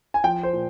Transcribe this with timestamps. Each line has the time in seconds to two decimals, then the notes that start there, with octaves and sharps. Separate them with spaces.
0.14 G#5
0.24 F3 G5
0.43 C5
0.53 A#2